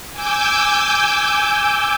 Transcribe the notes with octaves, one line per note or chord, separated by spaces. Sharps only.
G#5 D6 E6 G6